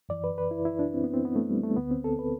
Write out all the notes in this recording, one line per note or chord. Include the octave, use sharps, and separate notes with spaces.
F#2 E3 D5
B4
B4
E4
E4
D4
C4
B3
C4
B3
A3
G3
A3
D2 D3 B3
C4
A4
B4